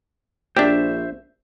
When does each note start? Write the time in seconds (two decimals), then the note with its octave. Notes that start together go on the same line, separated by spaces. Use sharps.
0.57 A#1 D4 G4 C5 E5